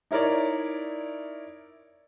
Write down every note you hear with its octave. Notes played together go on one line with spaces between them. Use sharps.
D#4 E4 A#4 C#5 D5